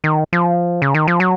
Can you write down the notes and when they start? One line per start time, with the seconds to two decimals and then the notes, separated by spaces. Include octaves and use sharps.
0.04 D#3
0.33 F3
0.82 C#3
0.95 D#3
1.08 F3
1.20 F#3